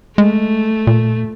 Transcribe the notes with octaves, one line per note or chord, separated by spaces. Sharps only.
G#3 A3
A#2